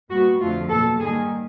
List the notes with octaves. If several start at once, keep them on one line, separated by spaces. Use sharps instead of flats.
A#2 G3 B3 F#4
F2 D3 F3 A3 F4
B2 F#3 A#3 A4
G#2 D#3 G3 A#3 G#4